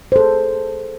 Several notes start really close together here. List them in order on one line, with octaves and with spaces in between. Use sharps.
C5 A4 G#4